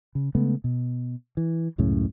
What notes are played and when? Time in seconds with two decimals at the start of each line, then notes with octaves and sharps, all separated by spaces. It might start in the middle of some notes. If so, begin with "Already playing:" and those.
0.15 C#3
0.35 C#3 G#3 A3 B3
0.64 B2
1.37 E3
1.78 C#2 F#2 A2 C#3